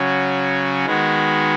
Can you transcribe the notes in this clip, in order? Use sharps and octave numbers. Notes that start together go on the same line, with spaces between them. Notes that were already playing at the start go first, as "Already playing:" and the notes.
Already playing: C#3 F#3 C#4 F#4
D#3 G#3 B3 F#4